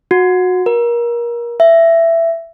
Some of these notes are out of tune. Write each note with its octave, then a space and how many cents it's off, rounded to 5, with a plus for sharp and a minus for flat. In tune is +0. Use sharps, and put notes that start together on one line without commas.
F#4 -20
A#4 +25
E5 +15